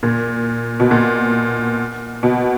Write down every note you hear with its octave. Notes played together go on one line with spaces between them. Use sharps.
A#2
B2
A#2
B2